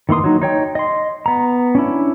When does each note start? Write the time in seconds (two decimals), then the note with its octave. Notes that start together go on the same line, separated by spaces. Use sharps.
0.09 D#3 E3 A#3 C6 D#6
0.24 F#3 D#4
0.41 D#4 C#5 G5
0.75 D#5 C6
1.26 B3 A#5
1.75 C#4 D4 E4